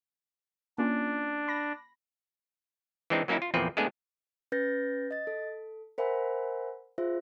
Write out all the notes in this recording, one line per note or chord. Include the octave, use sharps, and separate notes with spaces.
A#3 C#4 D4 F4
B5 A#6
E3 G#3 C4 D4 D#4
F#3 A#3 C#4 D#4 E4
F4
E2 A#2 F3 C4 B4
G#3 A3 B3 D4 G#4
C#4 B4 G6 A6 A#6
D#5 A6
A4
A#4 C5 E5 F#5 G#5 B5
F4 G#4 C5 E5